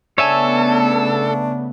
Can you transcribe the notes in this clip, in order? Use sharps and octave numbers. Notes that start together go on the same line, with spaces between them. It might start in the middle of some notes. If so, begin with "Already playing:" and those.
C#3 A3 B3 D4 A4 C#5 E5 G#5